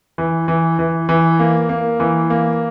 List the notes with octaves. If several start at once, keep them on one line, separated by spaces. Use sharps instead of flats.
E3
E3
E3
E3
A#3
A#3
E3
A#3